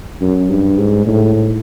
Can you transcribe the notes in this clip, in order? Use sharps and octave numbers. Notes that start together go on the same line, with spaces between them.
F#2
G2
G#2
A2